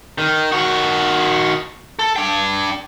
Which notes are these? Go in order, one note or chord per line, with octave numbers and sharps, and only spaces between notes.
D#3
D#3 F#4
A4
D4 G5